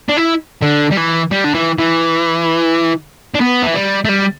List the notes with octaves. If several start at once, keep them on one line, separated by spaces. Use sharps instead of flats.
D4
E4
D3
G3
E3
G3
D3
E3
E3
D4
B3
E3
G3
A3
G3